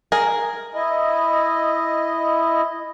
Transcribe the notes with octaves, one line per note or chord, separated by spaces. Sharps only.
G#4 A#4
E4 D#5